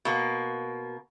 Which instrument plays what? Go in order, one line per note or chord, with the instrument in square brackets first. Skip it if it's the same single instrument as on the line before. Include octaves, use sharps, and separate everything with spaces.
[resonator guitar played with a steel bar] B2 A#3